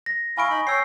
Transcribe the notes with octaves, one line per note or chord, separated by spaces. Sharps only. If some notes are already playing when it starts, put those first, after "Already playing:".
A#6
E4 F5 G#5 C#6 D7
D#4 B5
C#5 G5 E6 C7